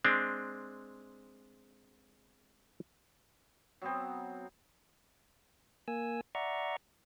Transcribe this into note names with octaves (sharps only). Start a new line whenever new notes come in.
G#3 C4 D4
F#3 B3 C4
A#3 G#5 E6
D5 E5 F#5 A#5 C#6